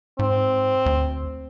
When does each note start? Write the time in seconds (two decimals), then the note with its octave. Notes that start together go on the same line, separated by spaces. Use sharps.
0.19 G#2 C4
0.86 D2